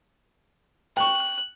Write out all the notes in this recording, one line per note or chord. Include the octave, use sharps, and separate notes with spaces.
G5 C#6 F#6